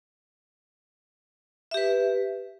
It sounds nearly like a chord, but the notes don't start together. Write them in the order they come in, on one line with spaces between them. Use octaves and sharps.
E5 G4 B4